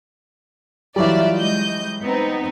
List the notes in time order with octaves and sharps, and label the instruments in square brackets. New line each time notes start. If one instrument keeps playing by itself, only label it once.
[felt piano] E3 F#3 G3 [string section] F4 D5 E5
[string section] G#3 D#5 G6
B3 C4 D#4